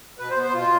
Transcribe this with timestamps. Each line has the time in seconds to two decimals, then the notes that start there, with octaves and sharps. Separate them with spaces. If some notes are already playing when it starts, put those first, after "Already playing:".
0.19 B2 B4
0.31 C5
0.37 B3
0.43 C5
0.54 B2 F4